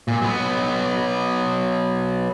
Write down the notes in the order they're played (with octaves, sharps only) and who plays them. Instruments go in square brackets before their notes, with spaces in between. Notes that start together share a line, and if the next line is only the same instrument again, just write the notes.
[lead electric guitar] A#2
F#3 B3